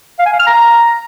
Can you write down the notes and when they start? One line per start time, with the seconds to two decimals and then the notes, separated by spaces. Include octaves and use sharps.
0.19 F5
0.26 G#5
0.32 F5
0.39 F6
0.46 A#5